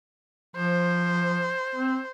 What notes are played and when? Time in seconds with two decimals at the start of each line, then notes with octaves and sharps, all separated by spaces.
0.56 F3 C5
1.75 C4